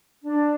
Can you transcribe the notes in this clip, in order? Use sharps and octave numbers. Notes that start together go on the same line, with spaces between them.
D4